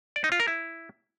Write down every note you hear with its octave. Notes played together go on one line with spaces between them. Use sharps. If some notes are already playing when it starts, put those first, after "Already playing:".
D5
D#4
F4
A#4
E4